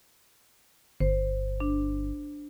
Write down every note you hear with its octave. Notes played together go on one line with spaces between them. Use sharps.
G1 C5
D4